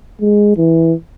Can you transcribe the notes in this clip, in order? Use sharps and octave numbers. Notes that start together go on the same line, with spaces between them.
G#3
E3